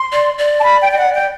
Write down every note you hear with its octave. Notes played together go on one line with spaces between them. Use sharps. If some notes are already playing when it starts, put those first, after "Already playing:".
Already playing: C6
D5
D5
A5
B5
G5
G5
F#5
G5